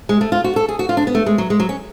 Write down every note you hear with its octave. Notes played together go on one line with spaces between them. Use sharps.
G#3
A3
F4
F#4
A4
G#4
F#4
F4
D4
B3
A3
G#3
F#3
G#3
F#3
C#4